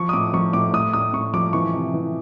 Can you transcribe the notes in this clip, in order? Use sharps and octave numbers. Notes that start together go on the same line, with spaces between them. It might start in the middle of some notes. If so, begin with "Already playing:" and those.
Already playing: F3 C#6
D#6
A2 D6
F3 C#6
A2 D6
A2 D#6
A2 D#6
A2 C#6
F3 D6
E3 C#6
C3
E3